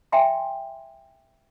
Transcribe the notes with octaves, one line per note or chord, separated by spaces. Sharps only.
E5 G5 G#5 A#5 C6